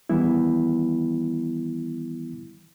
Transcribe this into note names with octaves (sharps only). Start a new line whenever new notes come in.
D#3 E3 G3 B3 E4